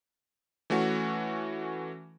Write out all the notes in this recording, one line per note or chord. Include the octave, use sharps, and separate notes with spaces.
E3 A3 C#4 F#4